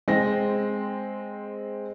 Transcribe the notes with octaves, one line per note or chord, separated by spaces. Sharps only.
G#3 C4 A#6